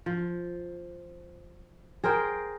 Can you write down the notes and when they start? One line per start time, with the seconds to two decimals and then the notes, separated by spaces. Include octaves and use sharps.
0.06 F3
2.04 G#4 A#4 C5 G5